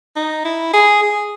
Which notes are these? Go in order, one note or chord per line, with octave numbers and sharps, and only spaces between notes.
D#4
E4
G#4
G#4